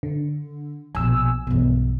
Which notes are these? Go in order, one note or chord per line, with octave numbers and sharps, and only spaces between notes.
D3
A#1 B2 G#5 E6
B1 G2 B2 E3